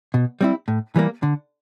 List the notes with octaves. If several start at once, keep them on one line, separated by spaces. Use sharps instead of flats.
B2
G3 C4 E4
A2
E3 G3 A#3
D3